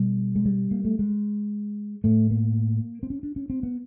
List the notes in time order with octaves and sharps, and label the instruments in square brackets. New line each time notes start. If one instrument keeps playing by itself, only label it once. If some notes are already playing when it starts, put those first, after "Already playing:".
Already playing: [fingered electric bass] B2 G3
G#3
G3
A#3
A3
G#3
A2 A3
A#3
C4
C#4
D4
C#4
C4
B3